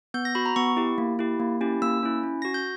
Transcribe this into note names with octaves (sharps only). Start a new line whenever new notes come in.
B3 G6
A#6
F#4 B5
A#5
B3 C#6
E4 G4
A#3
E4 G4
A#3
C#4 E4 G4
A#3 E6
C#4 E4
C#4
F#4 A#6
G6